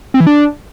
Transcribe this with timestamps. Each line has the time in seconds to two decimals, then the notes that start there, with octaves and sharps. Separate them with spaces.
0.14 C4
0.20 E3
0.27 D4